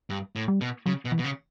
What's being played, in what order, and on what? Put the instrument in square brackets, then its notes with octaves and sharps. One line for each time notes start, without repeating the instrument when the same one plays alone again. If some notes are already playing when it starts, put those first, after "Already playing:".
[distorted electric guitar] G2
A2
[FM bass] G3
[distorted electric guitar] B2
[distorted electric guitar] C#3 [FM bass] F#3
[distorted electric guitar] B2
[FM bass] E3
[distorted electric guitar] B2
C#3